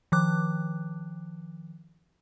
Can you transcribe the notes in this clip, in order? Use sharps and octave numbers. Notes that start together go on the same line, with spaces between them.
D#3 F3 D6 F#6